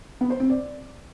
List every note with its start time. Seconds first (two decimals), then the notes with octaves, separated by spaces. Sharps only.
0.21 B3
0.30 C5
0.40 C4
0.50 D5